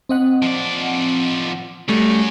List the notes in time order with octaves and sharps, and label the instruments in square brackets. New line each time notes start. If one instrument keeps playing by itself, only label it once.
[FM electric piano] C4 D#5 F#5
[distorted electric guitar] F3 D5
[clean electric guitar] G3 A3 [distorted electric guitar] C#4 F#4